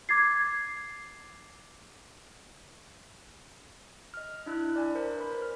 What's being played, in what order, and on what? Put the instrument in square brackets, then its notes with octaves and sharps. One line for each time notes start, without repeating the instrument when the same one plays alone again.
[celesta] D6 G#6 A6 C7
[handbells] D#5 F6
D4 E4 E6 F#6
D4 D5 G#5
A#4 C5
B4 B5
F6